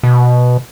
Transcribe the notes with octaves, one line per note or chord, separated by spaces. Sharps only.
B2